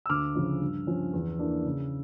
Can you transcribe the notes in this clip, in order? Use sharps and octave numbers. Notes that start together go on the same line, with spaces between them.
E6
D2 D6 F6
C#3 F3 C#4
G2
F3 C#4
E2
E3 A#3 D4
C#3